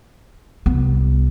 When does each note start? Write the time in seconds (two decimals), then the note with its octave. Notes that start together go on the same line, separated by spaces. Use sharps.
0.66 C2 B3